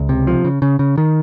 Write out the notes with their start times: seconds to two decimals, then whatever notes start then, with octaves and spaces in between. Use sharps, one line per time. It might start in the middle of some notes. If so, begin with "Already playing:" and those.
Already playing: C#2
0.09 C3
0.27 F3
0.45 C#3
0.62 C#3
0.79 C#3
0.98 D#3